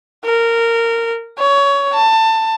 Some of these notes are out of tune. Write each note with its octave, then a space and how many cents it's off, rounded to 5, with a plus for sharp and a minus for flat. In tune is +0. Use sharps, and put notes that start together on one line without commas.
A#4 -15
C#5 +20
A5 +20